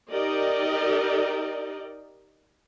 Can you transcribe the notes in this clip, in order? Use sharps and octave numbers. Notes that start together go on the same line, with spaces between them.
D#4 G4 A#4 D5 D#5